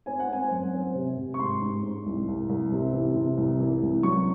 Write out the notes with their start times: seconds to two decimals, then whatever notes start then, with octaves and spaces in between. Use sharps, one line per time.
0.06 C4 G#5
0.19 F#5
0.28 C4 G#5
0.51 F#2
0.74 C4
0.95 C3
1.17 C3
1.34 C#6
1.39 G#2 C6
1.62 G#2
1.83 G#2
2.06 C2
2.28 C2
2.49 C2
2.72 C3
2.93 E3
3.16 C3
3.37 C2
3.60 E3
3.82 C2
4.03 F#3 C#6